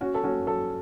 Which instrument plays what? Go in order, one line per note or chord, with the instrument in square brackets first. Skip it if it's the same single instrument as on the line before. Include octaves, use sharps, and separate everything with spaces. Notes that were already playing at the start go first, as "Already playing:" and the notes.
[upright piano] C#4 F#4
A4
C#4 F#4
F#3 A4